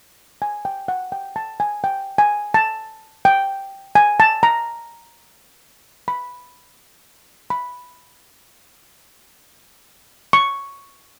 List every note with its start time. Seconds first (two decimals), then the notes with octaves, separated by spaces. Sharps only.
0.42 G#5
0.65 G5
0.88 F#5
1.12 G5
1.36 A5
1.60 G#5
1.84 G5
2.18 G#5
2.54 A5
3.25 G5
3.95 G#5
4.20 A5
4.43 A#5
6.08 B5
7.50 B5
10.33 C#6